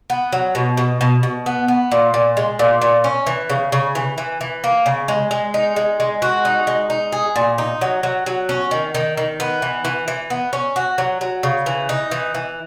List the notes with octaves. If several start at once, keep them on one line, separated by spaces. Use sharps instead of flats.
B3
F#3
B2
B2
B2
B2
B3
B3
A#2
A#2
G#3
A#2
A#2
C#4
E3
C#3
C#3
E3
E3
E3
A#3
C#3
G#3
G#3
D#4
G#3
G#3
F#4
D#4
G#3
D#4
G#4
A#2
D#4
F#3
F#3
F#3
C#4
D#3
D#3
D#3
B3
E3
E3
E3
B3
C#4
F#4
F#3
F#3
C#3
E3
D#4
E3
E3